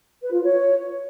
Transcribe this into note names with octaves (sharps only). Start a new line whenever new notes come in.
B4
F4
C#5